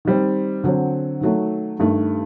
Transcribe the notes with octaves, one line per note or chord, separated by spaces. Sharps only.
D#3 G3 C4
D3 F#3 C4
D#3 F#3 A3
G2 D#3 A3